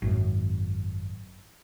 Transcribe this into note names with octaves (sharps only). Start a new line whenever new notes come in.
G#1 F#2